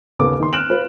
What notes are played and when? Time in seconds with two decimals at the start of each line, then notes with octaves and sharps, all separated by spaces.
0.19 D#2 C#3 B3 A4 D6
0.40 D#3 C6
0.53 F6 F#6 D7 E7 F#7
0.70 F4 B4